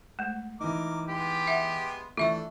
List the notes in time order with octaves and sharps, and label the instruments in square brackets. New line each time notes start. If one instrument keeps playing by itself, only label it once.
[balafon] G#3 A3
[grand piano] E3 D#4 [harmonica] A#4 D6
[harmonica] G#3 B3 C6 [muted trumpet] G4
[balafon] E5 F#5
[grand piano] E3 A3 [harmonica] D4 A4 [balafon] F4 E5 C#6